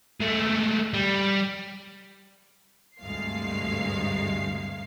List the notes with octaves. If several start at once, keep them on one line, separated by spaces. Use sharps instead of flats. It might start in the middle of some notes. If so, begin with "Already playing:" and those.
G#3 A3
G3
D2 G2 C3 G#3 F5 C7